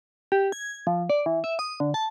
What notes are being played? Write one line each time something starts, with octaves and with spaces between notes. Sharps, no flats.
G4
G#6
F3
D5
E3
E5
D#6
D3
A5